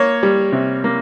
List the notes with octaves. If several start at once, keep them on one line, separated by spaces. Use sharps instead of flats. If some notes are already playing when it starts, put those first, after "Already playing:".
Already playing: A#3 C#5
G3
C3
A#3